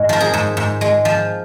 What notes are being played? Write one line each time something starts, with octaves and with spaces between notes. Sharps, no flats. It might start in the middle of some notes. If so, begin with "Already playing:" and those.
Already playing: G#2 G#3 D#4
F3 A#4
G#4
G#2
G#2
G#3
F3